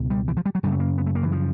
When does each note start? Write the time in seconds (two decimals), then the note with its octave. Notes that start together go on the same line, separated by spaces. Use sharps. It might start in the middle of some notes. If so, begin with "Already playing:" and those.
Already playing: C#2 B2
0.10 G3
0.28 E3
0.37 F3
0.46 G3
0.55 F#3
0.63 F#2 C#3 G3
0.72 A3
0.80 A#3
0.98 B3
1.06 A3
1.15 A#3
1.23 E3
1.32 F3